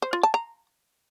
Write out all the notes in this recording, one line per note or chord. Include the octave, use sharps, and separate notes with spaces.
C5
F4
A5
A#5